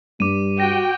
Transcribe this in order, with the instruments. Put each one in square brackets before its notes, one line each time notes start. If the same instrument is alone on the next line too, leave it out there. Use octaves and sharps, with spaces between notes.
[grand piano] G2 [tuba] G3 [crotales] D6 D#7
[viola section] F#4 G5 [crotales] A#6